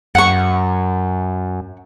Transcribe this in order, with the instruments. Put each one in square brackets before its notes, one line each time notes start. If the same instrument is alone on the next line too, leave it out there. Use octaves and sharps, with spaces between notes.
[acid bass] F#2 [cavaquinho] F#5 C#6